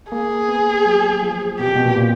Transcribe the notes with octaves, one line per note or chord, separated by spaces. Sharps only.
A#3 G#4
B3
F#3
F3
B2 G4
C3
B2
A#2
A#2